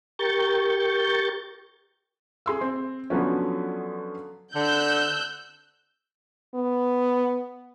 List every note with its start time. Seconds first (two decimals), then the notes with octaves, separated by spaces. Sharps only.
0.19 G4 A#4 C#6 G6 A6
2.46 G#4 C6 E6
2.61 C4
3.10 D3 F3 F#3 B3 C#4
4.55 D3 E6 F#6 G6
6.55 B3